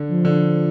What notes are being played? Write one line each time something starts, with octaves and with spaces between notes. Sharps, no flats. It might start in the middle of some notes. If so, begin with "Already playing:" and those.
Already playing: D3
F3
D3